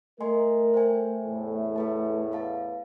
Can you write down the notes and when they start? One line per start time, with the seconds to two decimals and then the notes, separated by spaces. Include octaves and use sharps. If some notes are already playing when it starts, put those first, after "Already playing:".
0.20 A3 A#4 D#5 G#5 C6
0.74 C5 G5 G#5
1.23 E2 A2
1.76 A4 B4 A5
2.32 B4 F5 A5